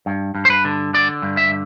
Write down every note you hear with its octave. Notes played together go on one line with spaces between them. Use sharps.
G2
G2
C5
B4
D3
D3 D5
G2
E5